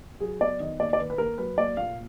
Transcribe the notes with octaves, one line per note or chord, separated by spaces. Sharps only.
F#3 G#4
B3 D5
D#3 D#5
A#3 D5
D5
D#3 B4
B4
A#3 A#4
F#3 B4
A#3 D5
A#2 F5